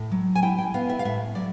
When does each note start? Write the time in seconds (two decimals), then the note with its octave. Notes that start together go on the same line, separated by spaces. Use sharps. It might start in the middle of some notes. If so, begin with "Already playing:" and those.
Already playing: A2
0.12 F#3
0.35 G#5
0.42 E4 G5
0.58 G5
0.74 B3 F5
0.89 E5
0.99 F5
1.05 A2 E5
1.35 F#3 D5